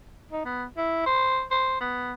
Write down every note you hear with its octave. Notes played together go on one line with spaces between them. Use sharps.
D#4
B3
E4
C5
C5
B3